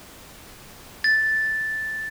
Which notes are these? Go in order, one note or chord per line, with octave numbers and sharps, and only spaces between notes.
A6